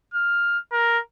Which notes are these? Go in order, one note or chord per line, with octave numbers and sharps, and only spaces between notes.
F6
A#4